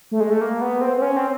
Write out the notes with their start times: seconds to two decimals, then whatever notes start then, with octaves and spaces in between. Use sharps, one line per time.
0.11 A3
0.20 G#3
0.30 A3
0.41 A#3
0.61 B3
0.81 C4
0.97 C4
1.02 C#4
1.17 C4